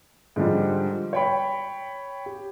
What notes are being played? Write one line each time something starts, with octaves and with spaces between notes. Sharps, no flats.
G#2 D3 F3 G3
C#5 G5 B5
G4